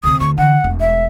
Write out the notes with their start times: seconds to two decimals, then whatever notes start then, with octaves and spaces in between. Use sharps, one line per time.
0.04 D2 C3 D#6
0.20 D2 C#6
0.38 D3 E3 F#5
0.64 E1 A3
0.80 E5